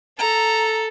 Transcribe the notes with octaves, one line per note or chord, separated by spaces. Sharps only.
A4 A#5